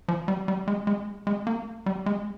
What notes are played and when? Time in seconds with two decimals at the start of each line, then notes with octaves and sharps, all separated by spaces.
0.08 F3
0.28 G3
0.48 G3
0.68 G#3
0.87 G#3
1.27 G#3
1.47 A#3
1.86 G3
2.06 G#3